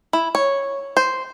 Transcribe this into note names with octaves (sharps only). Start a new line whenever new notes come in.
E4
C#5
C5